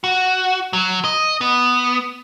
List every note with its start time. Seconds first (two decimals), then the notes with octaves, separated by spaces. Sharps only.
0.04 F#4
0.73 F#3
1.04 D#5
1.41 B3